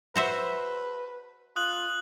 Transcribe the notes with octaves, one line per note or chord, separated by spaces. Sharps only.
F#4 B4 C5 E5
F4 D#6 F#6 F#7